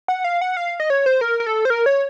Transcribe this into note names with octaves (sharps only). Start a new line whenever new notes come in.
F#5
F5
F#5
F5
D#5
C#5
C5
A#4
A#4
A4
C5
A#4
C#5